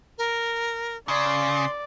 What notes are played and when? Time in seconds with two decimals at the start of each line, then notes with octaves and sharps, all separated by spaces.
0.18 A#4
1.08 C#3 D5 C6